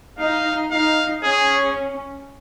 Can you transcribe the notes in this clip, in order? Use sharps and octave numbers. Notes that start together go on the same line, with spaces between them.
D#4 F5
D#4 F5
C#4 G#4